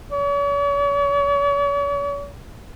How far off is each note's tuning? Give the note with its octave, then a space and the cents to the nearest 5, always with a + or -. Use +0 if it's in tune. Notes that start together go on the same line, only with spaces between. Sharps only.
C#5 +45